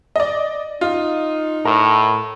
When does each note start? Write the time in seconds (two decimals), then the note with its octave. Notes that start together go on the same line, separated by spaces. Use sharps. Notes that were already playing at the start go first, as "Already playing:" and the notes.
0.16 D5 D#5
0.81 D#4 F4
1.65 A2 A#4